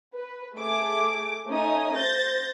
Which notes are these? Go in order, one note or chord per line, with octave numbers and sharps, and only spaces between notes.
B4
A3 G#4 D6
A3 C#4 D#4 G#5 D#6
C5 G6 A6 A#6